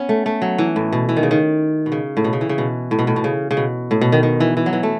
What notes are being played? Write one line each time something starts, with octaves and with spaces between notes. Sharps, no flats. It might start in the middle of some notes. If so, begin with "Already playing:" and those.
Already playing: B3 C#4
A3
A3
F#3
E3
A2
B2
E3
D#3
C#3
D#3
B2
C#3
A2
B2
C#3
E3
C#3
B2
A2
B2
A2
B2
C#3
C#3
B2
A2
B2
D#3
D#3
E3
E3
F#3
E3
A3